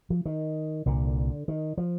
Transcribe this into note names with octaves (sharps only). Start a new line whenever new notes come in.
F3
D#3
C2 A#2 D3
D#3
F3